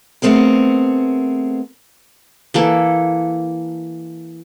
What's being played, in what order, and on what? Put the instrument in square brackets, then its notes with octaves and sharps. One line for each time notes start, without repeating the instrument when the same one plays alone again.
[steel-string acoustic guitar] A3 B3 C4 G#4 A#4
[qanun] E3 A#3 A4